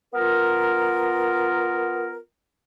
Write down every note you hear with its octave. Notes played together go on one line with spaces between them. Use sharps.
B3 F4 A#4